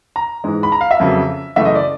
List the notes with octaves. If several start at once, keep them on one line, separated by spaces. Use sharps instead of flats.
A#5
G#2 E3 G#3
B5
A#5
F5
E5
F2 C#3 F#3 A#3
F#2 C#3 E3 A3 E5
D#5
D5